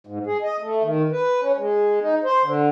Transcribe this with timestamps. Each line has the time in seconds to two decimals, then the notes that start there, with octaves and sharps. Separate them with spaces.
0.07 G#2
0.27 G#4
0.42 D#5
0.61 A3
0.83 D#3
1.12 B4
1.42 C#4
1.58 G#3
2.01 D#4
2.24 C5
2.43 D3